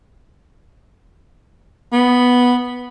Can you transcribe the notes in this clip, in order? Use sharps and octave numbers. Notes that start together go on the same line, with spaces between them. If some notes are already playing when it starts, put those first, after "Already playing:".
B3